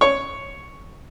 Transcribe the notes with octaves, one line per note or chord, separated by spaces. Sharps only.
C#5